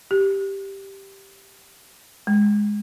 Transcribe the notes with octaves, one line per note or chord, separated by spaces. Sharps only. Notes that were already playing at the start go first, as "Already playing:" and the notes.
G4
G#3